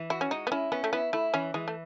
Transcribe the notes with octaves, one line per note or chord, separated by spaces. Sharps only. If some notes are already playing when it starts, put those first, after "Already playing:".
Already playing: E3
E4 F#4
C#4
G#3 D#4
B3
C#4 E4
B3 C#4
A3
B3 E4
A3 E4
E3 C#4
E3 G#3
A3